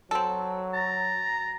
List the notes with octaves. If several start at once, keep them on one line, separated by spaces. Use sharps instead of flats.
F#3 C4 A4
A#5 A6